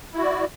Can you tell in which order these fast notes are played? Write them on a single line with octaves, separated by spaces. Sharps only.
E4 F#4 D5